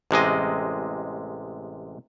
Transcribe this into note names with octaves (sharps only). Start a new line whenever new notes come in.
A1 C3 G#3 D#5